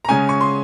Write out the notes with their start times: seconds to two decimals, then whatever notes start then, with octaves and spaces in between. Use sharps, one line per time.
0.05 A#5
0.08 C#3 G#3 C#4 G#5
0.29 C#6
0.41 C6